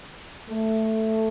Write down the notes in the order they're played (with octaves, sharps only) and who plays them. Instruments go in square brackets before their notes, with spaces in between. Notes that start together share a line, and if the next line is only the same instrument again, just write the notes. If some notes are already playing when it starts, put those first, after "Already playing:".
[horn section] A3